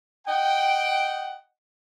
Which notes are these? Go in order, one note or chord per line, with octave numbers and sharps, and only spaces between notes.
D#5 F#5 G5